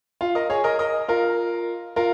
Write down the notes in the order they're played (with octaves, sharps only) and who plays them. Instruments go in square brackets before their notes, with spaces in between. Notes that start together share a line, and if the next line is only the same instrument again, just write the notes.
[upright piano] F4
A#4 D#5
G#4 C#5
A#4 D#5
A#4 D#5
F4 A#4
F4 A#4